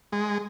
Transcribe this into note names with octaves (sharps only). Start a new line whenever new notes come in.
G#3